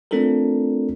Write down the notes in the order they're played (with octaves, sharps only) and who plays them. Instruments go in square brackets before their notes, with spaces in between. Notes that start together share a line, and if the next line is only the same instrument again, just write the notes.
[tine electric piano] A3 C4 D4 F4 A4 A#4